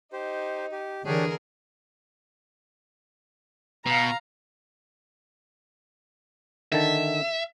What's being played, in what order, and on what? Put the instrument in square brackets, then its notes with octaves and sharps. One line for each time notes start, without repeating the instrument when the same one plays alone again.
[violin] D#4 [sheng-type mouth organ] G4 C5
[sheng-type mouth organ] G4
[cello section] D3 E3 [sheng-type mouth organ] D4 G4 C#5 [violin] G#4 A#4
[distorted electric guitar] B2 [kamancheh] F5 A#5
[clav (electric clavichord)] D3 D#3 A5 [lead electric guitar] E5